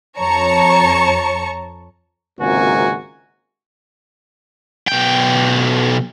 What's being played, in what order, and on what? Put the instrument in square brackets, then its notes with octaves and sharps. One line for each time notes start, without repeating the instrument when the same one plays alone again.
[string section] F2 C#5 A5 A#5 C#6 C#7
[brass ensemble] G#1 C#2 C3 A#3 F#4 G#5
[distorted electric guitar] B1 G5